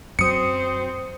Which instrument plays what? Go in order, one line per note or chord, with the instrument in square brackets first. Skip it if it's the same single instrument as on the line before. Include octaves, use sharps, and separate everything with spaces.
[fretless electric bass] F#2 F#3 [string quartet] C4 C5 [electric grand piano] D#6 C#7